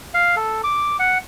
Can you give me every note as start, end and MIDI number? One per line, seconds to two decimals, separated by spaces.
0.14 0.36 77
0.36 0.62 69
0.64 0.97 86
0.99 1.18 78